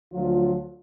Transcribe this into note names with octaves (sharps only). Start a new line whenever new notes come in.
D2 F3 F#3 F4